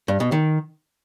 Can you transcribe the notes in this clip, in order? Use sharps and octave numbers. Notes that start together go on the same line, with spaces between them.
G2
B2
D#3